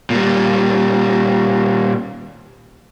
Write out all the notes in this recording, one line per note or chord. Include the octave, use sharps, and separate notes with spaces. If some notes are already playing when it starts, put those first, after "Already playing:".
A#2 G3